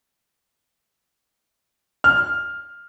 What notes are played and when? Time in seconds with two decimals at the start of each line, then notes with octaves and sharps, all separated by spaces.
2.04 F6